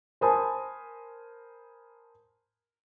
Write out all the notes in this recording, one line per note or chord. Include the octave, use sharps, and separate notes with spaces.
A#4 C5 G#5 A5 B5 D#6